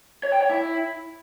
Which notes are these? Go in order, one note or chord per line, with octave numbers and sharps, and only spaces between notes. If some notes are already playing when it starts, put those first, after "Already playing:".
C#5
G5
C#5
E4